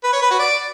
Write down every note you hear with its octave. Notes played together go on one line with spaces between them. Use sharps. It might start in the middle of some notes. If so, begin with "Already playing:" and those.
B4
C#5
B4
F#4
D5